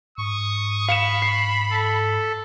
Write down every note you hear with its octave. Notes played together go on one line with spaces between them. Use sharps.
G#2 C#6 D#6
F5 B5 C#7 E7
C7
A4